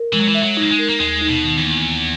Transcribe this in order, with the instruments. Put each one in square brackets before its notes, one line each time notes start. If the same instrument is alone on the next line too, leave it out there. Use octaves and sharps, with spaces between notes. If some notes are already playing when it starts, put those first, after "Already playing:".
Already playing: [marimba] A#4
[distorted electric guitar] E3 [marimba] G#3
[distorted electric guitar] F#3
E3
[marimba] E5
[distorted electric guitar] F#3
[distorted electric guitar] A#3 [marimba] D#4
[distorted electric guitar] G#3
[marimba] A#4
[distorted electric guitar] A#3
[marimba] D#2 [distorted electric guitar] G#3
[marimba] D#4
[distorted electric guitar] B2
[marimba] D#3
[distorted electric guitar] E2
[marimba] A#3
D#2